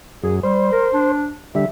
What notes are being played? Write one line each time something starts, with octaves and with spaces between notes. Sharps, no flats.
F#2 G#4
G3 C5
A#4
D4
D3 G3 E5